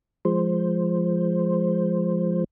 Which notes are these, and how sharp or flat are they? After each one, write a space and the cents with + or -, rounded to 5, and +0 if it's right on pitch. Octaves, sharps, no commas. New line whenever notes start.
F3 -10 G#3 +0 C5 +0